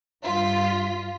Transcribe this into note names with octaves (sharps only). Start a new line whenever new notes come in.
G2 F4 B6